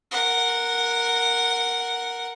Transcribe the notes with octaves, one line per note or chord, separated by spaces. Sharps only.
A#4 F#5